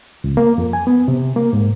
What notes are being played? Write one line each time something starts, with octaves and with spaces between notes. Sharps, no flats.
C#2
A#3
F2
G#5
B3
C3
A#3
G#2